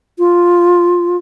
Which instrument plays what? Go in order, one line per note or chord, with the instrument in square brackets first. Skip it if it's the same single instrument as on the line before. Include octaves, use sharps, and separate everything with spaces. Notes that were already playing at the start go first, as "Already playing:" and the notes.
[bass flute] F4